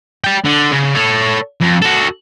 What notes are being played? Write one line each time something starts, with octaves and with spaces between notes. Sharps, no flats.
D5 G5
D3
C#3
A4 C#5
F2
F#4 A4